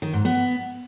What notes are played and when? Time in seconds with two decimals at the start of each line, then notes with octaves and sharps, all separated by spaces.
0.02 D#3
0.13 G#2
0.25 B3